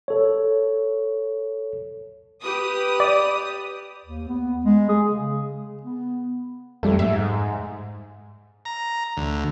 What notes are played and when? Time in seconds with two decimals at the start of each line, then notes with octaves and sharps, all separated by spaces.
0.08 A4 C#5
2.40 G4 B4 D#6
3.00 D5
4.05 D#2
4.28 B3
4.65 G#3
4.89 G#4
5.06 C#3
5.83 B3
6.83 F2 G3 A3
6.99 G#2 E5
8.65 A#5
9.17 D2